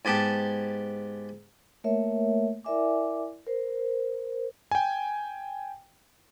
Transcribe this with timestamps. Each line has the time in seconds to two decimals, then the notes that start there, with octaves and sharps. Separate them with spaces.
0.05 G#2 B3 G4 A5
1.84 A3 A#3 A#4 C#5 E5
2.64 E4 A#4 D5 E5 G#5 D6
3.46 A#4 C5
4.71 G5 G#5